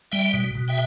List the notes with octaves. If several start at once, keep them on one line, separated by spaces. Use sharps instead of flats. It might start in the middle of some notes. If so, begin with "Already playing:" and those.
G3 E5 G5
B2
B2
E5 G5